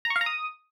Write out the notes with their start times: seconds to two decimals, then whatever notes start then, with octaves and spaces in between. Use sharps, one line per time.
0.05 A#5
0.10 C#6
0.16 F5
0.21 A#5
0.26 D#6